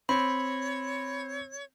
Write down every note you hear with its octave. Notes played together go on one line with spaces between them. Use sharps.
C4 C#5 B5